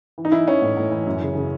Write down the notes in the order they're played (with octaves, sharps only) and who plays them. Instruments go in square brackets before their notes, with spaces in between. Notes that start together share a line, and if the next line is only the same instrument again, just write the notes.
[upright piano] E3
D#4
E3 E4
E3 C#4
A2
A2
E3
F#2
C#3
C#3